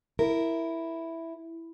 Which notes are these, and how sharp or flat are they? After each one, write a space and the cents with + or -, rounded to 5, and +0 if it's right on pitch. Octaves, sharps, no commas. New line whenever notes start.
E4 +0 A#4 -5